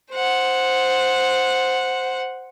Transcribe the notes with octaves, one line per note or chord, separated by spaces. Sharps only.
C5 F#5